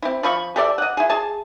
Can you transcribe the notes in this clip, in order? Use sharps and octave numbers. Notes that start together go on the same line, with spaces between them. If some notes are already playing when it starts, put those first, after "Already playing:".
C4 E4
F3 B5 C#6
G4 A4 D5 E5
D#5 F#5
E4 G#4
G#4 A5